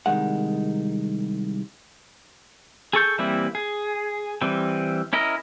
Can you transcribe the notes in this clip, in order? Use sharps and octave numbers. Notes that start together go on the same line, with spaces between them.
C2 A#2 D#3 G#3 F#5
G#4 A4 C#6 G6
E3 G3 A#3 C4 E4
G#4
E3 G3 C4
C#4 E4 A#4 D#5